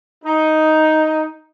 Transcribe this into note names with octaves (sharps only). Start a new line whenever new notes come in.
D#4